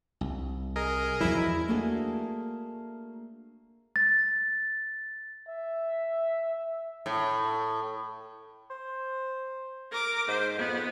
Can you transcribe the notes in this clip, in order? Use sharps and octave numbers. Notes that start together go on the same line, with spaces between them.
C2
G#4 A#4 D#5
E2 F3 F#3 E4
A3 A#3 D4 F#4 G#4 A4
A6
E5
A2
C5
A#4 D6
G#2 C5
F2 B3